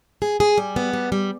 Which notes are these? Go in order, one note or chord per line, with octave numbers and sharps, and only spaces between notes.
G#4
G#4
G3
B3
G3
G3